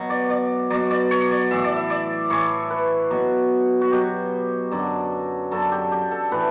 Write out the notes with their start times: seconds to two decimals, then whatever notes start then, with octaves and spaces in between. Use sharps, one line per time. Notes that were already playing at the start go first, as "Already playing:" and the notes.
Already playing: B2 F#3
0.10 D5
0.30 D5
0.70 B2 F#3 D5
0.91 D5
1.11 C#5
1.31 D5
1.51 A2 E3 E5
1.64 D5
1.76 E5
1.90 D5
2.30 A2 E3 C#5
2.70 B4
3.10 B2 F#3
3.81 F#4
3.91 B2 F#3 G4
4.71 F#2 D3 F#3
5.51 F#2 D3 F#3 A4
5.71 G4
5.91 G4
6.11 A4
6.31 A2 E3 B4